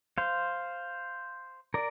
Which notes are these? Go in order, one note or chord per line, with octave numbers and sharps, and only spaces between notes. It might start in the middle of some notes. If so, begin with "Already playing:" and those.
C5 F5
A#4 D5